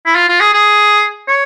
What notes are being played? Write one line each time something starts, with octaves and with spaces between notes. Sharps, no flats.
E4
F4
F4
G#4
G#4
C#5